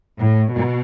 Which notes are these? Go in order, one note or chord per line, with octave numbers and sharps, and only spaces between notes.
A2
B2